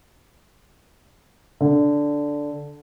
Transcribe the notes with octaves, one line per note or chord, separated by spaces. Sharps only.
D3